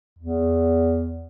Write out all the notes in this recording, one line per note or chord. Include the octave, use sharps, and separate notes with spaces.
E2